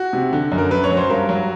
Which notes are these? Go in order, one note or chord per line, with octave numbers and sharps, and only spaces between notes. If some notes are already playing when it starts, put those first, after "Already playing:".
Already playing: F#4
C3
D3
F#2
A#4
F#2 B4
C#5
F#3
C5
G2 A#4
F#3